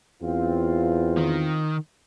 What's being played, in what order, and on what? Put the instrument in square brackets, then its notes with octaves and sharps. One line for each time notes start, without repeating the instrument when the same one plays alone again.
[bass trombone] E2 [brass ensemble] C4 F4
[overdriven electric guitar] D#3